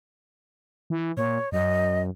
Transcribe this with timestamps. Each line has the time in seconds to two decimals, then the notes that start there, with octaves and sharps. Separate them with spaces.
0.90 E3
1.17 A#2 C#5
1.52 F#2 D#5